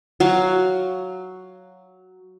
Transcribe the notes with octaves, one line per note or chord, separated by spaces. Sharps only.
F#3 F#4 F5